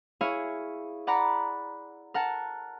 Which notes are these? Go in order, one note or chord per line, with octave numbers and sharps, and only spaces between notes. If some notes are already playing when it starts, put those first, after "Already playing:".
E4 G#4 C#5 F5
D5 F#5 A#5 B5
A#4 F#5 A5